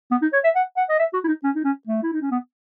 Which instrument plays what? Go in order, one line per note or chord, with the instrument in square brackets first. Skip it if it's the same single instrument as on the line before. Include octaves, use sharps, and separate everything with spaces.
[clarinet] B3
D#4
C#5
E5
F#5
F#5
D#5
E5
F#4
E4
D#4
C#4
D#4
C#4
A3
E4
D#4
C#4
B3